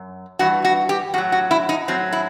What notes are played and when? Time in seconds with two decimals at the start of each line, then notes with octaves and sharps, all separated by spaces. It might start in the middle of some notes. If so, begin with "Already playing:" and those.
Already playing: F#2
0.39 G2 E3 F#4
0.65 F#4
0.89 G4
1.14 A2 F#3 F#4
1.32 F#4
1.51 E4
1.69 D#4
1.88 A2 F#3 C4
2.13 E4